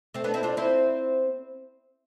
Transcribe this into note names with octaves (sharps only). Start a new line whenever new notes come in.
A3 C4
B3 D4
C4 E4
D4 F4
C4 E4